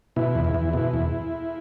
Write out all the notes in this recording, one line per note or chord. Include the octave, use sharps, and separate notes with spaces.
B2 E4
E2
E4
E2
B2 E4
E2